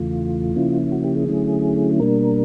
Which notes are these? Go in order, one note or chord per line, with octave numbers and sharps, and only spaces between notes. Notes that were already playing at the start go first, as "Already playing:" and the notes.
Already playing: E2 C#3 E3 A3 F4
C#3 F3 A#3 C#4 E4
F#4
G4
G#4
D3 F#3 A3 C#4 E4
B2 G3 A#3 D4 A#4